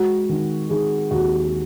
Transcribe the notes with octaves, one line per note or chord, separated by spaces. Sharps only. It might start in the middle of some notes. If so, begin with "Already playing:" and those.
Already playing: G#3 F#4
D#3
D#3 G#4
D#2 F#4